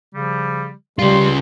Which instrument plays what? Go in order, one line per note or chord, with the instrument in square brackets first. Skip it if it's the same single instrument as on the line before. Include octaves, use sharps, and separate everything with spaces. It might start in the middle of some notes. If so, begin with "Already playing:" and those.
[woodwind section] C#3 F3 G3
[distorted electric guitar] C#3 F4 [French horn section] G3 [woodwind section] C6